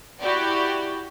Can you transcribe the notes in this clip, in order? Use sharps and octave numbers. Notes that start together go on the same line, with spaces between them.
E4 F#4 G4 D5